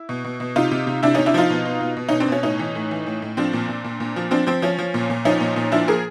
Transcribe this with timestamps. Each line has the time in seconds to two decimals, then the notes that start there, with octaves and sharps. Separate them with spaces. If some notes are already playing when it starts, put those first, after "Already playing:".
Already playing: E4
0.09 B2
0.24 B2
0.40 B2
0.56 C3 D#4 F4
0.71 C3
0.87 C3
1.03 C3 D4 E4
1.14 C3 C#4 D#4
1.26 D4 E4
1.34 F3 D#4 F4
1.50 B2
1.65 B2
1.81 B2
1.97 B2
2.09 B2 C#4 D#4
2.20 C4 D4
2.28 B2 C#4
2.43 A2 C#4 D#4
2.59 E3
2.75 A2
2.91 E3
3.06 A2
3.22 A2
3.37 F3 C4 D4
3.53 A#2
3.68 A#2
3.84 A#2
4.00 A#2
4.16 F3
4.31 F3 C4 D4
4.47 F3 C4
4.62 F3 C#4
4.78 F3
4.94 A#2
5.10 A#2
5.25 F3 C#4 D#4
5.41 A#2
5.56 A#2
5.72 F3 D4 E4
5.88 F3 G#4 A#4